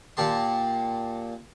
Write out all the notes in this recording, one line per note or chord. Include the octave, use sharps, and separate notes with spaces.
A#2 G4 A5 C6